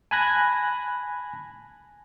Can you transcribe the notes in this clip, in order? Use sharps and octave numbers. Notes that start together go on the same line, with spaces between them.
G#5 A5 B5 F#6 G#6 A#6